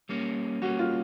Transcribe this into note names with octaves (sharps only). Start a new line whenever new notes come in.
G3 A#3 C#4
G3 A#3 C#4 F#4
F4